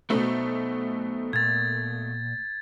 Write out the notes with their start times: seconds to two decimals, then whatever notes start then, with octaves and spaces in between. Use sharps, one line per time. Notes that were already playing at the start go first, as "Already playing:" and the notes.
0.10 B2 A3 B3 D#4 C5
1.33 A#2 G#6 A6